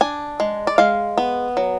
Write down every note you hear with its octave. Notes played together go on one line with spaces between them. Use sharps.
D4 G#5
G#3
D5
G#3 F5
B3
F#3